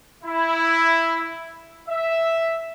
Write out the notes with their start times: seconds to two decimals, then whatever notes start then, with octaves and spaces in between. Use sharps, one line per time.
0.23 E4
1.88 E5